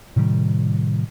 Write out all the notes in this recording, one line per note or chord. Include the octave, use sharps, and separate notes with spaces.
A2 C3 D#3 G3